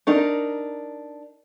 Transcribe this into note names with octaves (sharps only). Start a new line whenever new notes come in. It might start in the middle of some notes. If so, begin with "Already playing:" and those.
D4 D#4 A#4